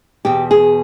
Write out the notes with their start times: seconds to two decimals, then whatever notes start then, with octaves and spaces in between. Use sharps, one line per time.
0.25 E2 B2 G4
0.51 G#4